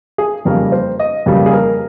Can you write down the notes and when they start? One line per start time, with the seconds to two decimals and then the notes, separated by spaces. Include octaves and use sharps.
0.18 G#4
0.45 F2 C#3 G3 A#3 A#4
0.72 C5
0.99 D#5
1.26 F2 C#3 G3 A#3
1.46 G#4
1.53 A#4